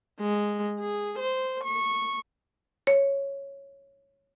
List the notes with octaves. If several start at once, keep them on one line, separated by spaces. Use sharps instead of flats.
G#3
G#4
C5
C#6
C#5